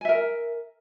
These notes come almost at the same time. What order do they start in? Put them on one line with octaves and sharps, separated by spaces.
G#5 E5 A#4